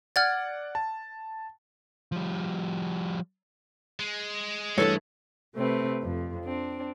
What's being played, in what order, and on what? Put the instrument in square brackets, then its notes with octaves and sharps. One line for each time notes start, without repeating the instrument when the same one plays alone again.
[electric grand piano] D5 F#5 [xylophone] F6 G#6 A6
[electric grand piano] A5
[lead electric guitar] F3 G3
[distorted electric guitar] G#3
[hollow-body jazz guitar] G2 E3 A3 [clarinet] A4 [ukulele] C#5
[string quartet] C3 A3 C4 B4
F2
C4 D4